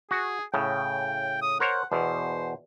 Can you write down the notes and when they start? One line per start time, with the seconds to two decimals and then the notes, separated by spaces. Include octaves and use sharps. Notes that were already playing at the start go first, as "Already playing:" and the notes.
0.11 F#4 G#4
0.54 A2 C#3 G5
1.42 D#6
1.60 A#4 C5 C#5 F#5
1.92 E2 B2 C5